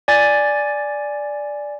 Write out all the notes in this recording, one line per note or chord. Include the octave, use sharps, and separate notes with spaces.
D5 G#5 A6